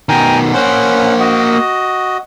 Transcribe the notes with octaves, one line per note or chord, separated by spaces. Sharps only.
B2 D#3 G5 G#5 A#5
A#3 C#4 C5 F#5
F#4 D#5